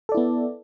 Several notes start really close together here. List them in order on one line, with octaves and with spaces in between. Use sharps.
A4 D5 E4 B3